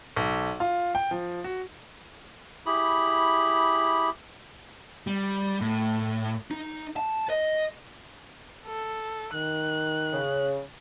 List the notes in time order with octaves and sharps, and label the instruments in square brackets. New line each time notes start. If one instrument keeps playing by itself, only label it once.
[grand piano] B1
F4
G5
F3
F#4
[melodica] E4 G4 G#4 B5
[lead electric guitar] G3
A2
D#4
A5
D#5
[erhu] A4
[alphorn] D#3 [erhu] F#6
[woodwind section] C#3